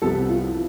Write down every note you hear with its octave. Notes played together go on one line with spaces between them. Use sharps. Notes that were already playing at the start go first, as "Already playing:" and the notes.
C2 C3 F3 B3 A4
G4
F4
E4